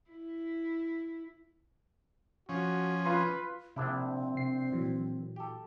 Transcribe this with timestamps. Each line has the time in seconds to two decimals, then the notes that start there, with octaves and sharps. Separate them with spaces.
0.10 E4
2.49 F3 C#4 F#4
3.05 F4 B4 C6
3.76 A#1 C3 C4 D4 E4
4.35 C3 C7
4.72 A#2 E3 F#3
5.36 G4 A4